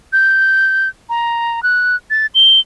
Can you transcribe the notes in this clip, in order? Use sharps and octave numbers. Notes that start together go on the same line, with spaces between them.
G6
A#5
F#6
A6
G7